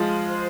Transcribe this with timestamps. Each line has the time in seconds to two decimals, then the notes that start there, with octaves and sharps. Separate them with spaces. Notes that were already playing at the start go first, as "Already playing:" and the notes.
Already playing: F3 G#3 F4
0.30 C5